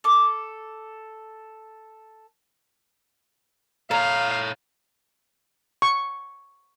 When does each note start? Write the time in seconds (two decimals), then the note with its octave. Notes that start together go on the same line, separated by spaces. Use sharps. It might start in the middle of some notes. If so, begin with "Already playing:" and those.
0.04 A4 D6
3.91 A4 C#5 F5 A#5
5.82 C#6